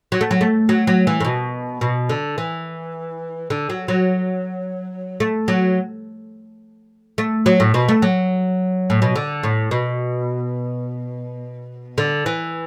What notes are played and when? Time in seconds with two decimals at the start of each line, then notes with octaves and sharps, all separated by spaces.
0.12 F#3
0.21 A3
0.31 F#3
0.41 A3
0.69 F#3
0.87 F#3
1.07 E3
1.20 A2
1.25 B2
1.81 B2
2.09 D3
2.38 E3
3.50 D3
3.70 F#3
3.88 F#3
5.20 A3
5.48 F#3
7.18 A3
7.46 F#3
7.60 A2
7.74 B2
7.88 A3
8.02 F#3
8.90 A2
9.02 B2
9.16 D3
9.43 A2
9.71 B2
11.98 D3
12.26 E3